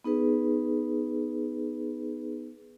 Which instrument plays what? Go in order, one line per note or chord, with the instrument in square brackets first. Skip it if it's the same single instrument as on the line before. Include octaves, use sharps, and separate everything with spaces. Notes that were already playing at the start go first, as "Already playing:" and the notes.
[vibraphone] B3 D#4 G#4 B4